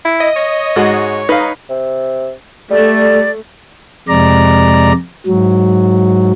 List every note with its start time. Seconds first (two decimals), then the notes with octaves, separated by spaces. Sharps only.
0.05 E4
0.20 D#5
0.36 C#5
0.76 G#2 G#3 F#4
1.29 D#4 B4 F5
1.70 C3
2.71 G3 A3 D5
4.08 F2 C3 G#3 D5 A#5
5.27 G#2 F#3